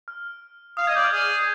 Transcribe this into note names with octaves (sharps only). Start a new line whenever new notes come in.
F6
F5 D#6
D#5 G#6
D5 G6
F6
G#4 D#6